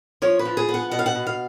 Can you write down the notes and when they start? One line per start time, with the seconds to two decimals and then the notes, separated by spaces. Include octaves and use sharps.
0.22 F3 C#5
0.39 B4
0.45 F3
0.57 G#4
0.69 B3
0.74 F#5
0.91 B2 F#5
0.99 F5
1.06 F#5
1.15 B2
1.27 F5